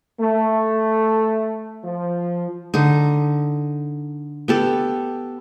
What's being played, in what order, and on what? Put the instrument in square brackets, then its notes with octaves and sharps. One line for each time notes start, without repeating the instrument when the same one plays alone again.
[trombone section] A3
F3
[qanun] D3 D#4
B3 G4 A4